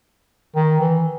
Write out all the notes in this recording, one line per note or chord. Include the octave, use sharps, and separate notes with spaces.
D#3
E3